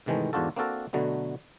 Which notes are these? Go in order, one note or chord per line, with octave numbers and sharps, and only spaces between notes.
G#2 C3 D#3 E3 G#3 A3
E2 G#2 D4 F4 F#4 A4
A#3 C4 D4 F#4 A4 A#4
B2 D3 F#3 A3 B3